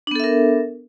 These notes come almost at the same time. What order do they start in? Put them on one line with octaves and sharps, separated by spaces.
D4 B3 A4 E5 A#4